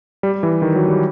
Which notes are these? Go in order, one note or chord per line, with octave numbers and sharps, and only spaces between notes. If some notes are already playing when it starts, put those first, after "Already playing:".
G3
E3
D#3
F#3
G3